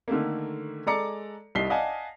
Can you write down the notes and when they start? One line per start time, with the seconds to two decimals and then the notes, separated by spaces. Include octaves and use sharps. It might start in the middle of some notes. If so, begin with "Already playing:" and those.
0.08 D3 D#3 A3 A#3
0.86 G#3 A4 D5 A#5 D6 C#7
1.55 C2 G3 D#4 B6 C7 G7
1.70 D5 D#5 F5 F#5 G#5 A5